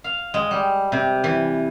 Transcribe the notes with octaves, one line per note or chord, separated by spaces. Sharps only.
F5
G#3
G3
C3
E3